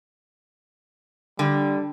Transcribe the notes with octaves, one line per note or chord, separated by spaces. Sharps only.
D3 G3